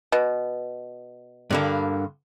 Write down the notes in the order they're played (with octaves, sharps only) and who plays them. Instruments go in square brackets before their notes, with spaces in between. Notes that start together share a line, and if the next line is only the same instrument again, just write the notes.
[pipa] B2
[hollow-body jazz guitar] G2 D3 A#3